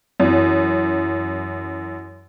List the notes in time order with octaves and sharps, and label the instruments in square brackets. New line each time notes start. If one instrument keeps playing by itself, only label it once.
[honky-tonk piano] F#2 E3